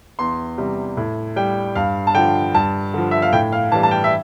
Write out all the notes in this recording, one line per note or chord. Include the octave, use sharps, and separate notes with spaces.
E2 C6
C3 G3
A2
G3 G5
G2 F5
A5
D3 F3 G5
G2 A5
D3 F3
E5
F5
A2 G5
F5
E3 G3 A5
A5
G5
E5